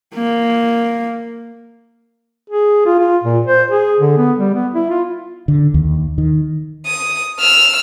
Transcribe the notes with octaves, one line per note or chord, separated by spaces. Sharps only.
A#3
G#4
F4
F4
A#2
C5
G#4
D3
B3
G3
B3
E4
F4
D3
D#2
D#3
D#6
E6 F6